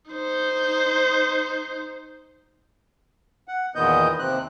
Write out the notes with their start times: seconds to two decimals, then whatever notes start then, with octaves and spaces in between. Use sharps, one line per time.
0.12 D#4 C5
3.48 F#5
3.75 E2 A#2 D#3 B3 D#5 G6
4.19 D#2 C3 C4 F#6